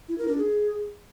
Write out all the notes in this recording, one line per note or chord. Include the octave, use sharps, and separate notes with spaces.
E4
A#4
D4
G#4